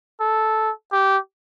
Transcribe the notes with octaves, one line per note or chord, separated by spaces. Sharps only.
A4
G4